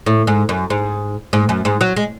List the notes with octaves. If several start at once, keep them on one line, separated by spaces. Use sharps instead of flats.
A2
G#2
F#2
G#2
G#2
F#2
G#2
F#3
G#3